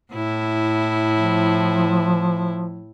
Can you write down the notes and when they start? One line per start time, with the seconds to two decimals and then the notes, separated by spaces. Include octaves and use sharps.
0.14 A2 E4
1.13 F3